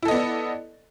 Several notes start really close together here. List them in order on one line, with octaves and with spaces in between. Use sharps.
E4 A4 D#5 B3 D5